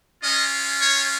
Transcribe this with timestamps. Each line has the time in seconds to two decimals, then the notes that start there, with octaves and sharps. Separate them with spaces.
0.22 G#3 C#4 F4 D#5
0.81 C#5